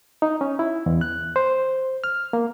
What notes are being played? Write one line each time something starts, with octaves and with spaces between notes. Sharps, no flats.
D#4
C#4
E4
E2
F#6
C5
F6
A#3